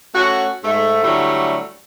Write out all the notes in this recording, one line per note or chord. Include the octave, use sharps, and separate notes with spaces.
A3 C#4 F#4
G#2 A3
A2 D3 F#3 G3 A3